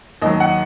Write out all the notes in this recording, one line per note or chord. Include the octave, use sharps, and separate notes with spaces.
D#2 D#3 F#3 D#5
F#5